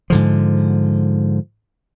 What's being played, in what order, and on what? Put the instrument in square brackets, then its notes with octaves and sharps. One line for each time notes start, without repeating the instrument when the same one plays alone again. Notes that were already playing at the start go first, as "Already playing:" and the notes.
[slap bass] G#2 D3 F3